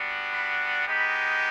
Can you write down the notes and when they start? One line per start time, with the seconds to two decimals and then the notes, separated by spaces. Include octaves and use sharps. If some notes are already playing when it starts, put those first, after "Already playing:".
Already playing: G3 B3 D4 F#4
0.31 B5
0.86 G#3 B3 D#4 G4 B5